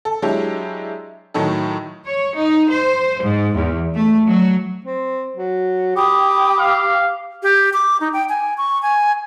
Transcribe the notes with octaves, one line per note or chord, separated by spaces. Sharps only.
A4
F#3 G#3 D4 E4 G4 C#5
A2 D#3 F#3 D#4 A4
C#5
D#4
C5
G#2
E2
A3
F#3
C4
F#3
G4 G5 B5 D#6
F5
G4
D6
D#4
G5
G#5
C#6
G#5